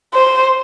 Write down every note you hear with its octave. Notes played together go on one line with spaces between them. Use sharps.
C5